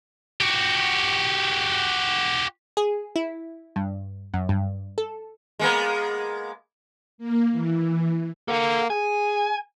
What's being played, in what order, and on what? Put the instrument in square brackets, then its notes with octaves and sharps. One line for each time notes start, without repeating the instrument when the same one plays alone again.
[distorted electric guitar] F#4 G4
[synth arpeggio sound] G#4
E4
G2
F#2
G2
A4
[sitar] G#3 A#3 B3
[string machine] A#3
E3
[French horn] A#3 [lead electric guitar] A4 F#5
[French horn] G#4 [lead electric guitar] G#5